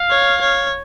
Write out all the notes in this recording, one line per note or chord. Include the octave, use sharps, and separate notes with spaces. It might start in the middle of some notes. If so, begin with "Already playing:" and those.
Already playing: F5
C#5
C#5